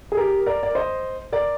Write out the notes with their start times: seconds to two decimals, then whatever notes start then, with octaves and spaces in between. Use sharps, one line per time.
0.12 G#4
0.17 G4 A#4
0.46 A#4 D5
0.63 D5
0.75 C5 D#5
1.32 A#4 D5